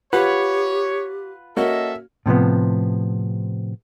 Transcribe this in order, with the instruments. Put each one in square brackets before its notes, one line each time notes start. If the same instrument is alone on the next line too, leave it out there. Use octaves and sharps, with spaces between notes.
[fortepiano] F4 B4 F#5 [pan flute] G4 [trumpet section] C#5
[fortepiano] A#3 C#4 F#4 [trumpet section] A4 E5 [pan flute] D#5
[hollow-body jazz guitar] A2 C3 F3 B3